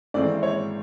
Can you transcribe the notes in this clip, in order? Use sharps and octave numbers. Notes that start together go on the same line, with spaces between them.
G#1 G#2 E3 A3 C4 D5
C#5